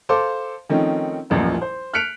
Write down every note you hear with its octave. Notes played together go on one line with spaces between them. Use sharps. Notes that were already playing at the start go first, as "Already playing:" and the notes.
A4 C5 F5 A5 C6 D6
D#3 F3 A3 C4 C#4 D#4
D#1 A1 F#2 A#2 F3
C5
F6 F#6 B6 C#7 D7 F7